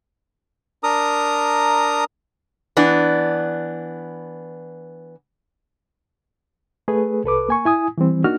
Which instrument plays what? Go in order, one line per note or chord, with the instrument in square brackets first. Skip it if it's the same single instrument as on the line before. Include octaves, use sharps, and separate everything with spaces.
[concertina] D4 A#4 A#5 D#6
[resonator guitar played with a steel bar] E3 B3 D4
[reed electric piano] A3 G#4 B4
C2 A4 B4 D6
A#3 G#5 C#6
E4 G#5 D#6
E3 G3 C4
A#3 D4 D#4 F#4 F6